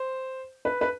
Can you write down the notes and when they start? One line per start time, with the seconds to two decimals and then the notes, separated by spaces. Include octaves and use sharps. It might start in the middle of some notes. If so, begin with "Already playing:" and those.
Already playing: C5
0.65 B4
0.81 B4